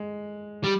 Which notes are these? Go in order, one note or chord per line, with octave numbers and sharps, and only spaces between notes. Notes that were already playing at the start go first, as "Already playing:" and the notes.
Already playing: G#3
G3